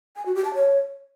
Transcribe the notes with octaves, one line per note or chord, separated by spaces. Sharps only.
G#5
F#4
G4
A5
C#5